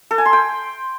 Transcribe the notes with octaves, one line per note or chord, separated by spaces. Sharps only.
A4
G#5
C6
G5